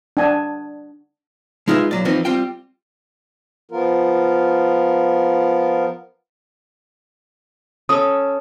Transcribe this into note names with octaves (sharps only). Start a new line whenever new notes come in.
D4 F#5 G#5 A5
G#3 D#4 F4 B4 D5 E5
B1 F#3 D5
E3 F3 A#3 C4 D#4
G3 C4 F4 G5
F3 B3 F4 A#4
C#4 A4 D#6